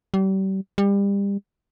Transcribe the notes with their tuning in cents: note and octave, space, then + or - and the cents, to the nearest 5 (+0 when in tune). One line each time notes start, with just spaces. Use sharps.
G3 -35
G3 +30